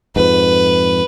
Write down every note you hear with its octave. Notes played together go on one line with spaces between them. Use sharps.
F2 G#2 B4